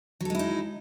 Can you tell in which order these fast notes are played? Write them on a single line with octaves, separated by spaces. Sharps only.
F#3 A4 G#3 E4 D#4